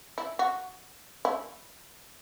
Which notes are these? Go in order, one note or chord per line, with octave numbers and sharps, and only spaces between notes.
E4
F#4
E4